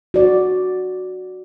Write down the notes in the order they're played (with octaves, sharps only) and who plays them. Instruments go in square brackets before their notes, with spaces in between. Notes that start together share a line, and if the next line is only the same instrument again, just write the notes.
[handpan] F#4 D5